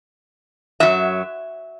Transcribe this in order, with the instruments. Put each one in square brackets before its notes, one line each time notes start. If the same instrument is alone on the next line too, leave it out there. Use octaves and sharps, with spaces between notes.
[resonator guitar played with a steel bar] F#2 F#3 E5